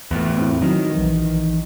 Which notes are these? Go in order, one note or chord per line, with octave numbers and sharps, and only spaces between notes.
E2 A2
C4 E4
D#3 F#3
A#1 E3